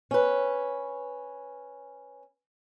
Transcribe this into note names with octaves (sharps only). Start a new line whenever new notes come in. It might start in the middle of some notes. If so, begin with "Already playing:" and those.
C#4 B4